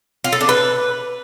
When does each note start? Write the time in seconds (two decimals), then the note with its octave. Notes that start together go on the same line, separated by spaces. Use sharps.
0.24 F4
0.33 A4
0.41 D4
0.49 B4